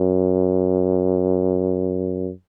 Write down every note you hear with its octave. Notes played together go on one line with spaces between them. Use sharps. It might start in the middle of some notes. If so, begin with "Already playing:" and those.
Already playing: F#2